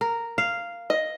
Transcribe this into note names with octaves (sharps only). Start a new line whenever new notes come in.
A#4
F5
D#5